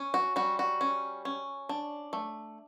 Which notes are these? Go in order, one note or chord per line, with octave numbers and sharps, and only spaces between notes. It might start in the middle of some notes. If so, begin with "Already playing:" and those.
Already playing: C#4
F#4
G3 F#4
F#4
C#4
C#4
D4
A3